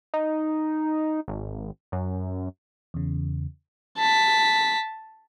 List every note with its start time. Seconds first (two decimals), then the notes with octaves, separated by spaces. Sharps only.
0.14 D#4
1.28 G#1
1.92 F#2
2.94 E2 C#3
3.97 A5 B6